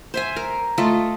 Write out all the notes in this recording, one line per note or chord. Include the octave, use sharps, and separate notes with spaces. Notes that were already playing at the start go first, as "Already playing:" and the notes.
C5 E5 G#5
A#4
A3 F4 A4 D#5